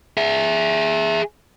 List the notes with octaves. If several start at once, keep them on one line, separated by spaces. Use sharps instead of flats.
G#4 E5